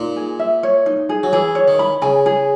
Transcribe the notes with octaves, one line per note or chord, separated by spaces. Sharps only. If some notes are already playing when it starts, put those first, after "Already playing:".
Already playing: A#2 D#4
G#4
E5
C#5
D#4
G#4
F#3
E3 G#4
C#5
D#3
B5
C#3 G#5
G#4